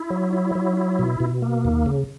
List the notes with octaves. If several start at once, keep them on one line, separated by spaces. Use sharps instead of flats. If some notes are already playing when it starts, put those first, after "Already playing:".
Already playing: E4
F#3
E4
F#3
E4
B2
B2
A#3
D#2
C#3